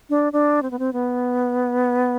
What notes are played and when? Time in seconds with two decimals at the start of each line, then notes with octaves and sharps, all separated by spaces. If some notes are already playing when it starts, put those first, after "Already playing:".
0.10 D4
0.33 D4
0.63 C4
0.71 B3
0.79 C4
0.93 B3